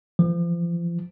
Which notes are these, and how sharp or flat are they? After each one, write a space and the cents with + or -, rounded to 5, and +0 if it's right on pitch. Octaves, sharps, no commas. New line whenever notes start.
F3 -35